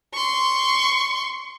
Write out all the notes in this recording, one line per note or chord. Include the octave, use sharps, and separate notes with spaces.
C6 C#6